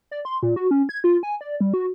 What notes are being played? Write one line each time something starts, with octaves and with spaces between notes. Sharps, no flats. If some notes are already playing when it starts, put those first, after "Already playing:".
D5
C6
A#2
F#4
C#4
G#6
F4
G#5
D5
G3
F#4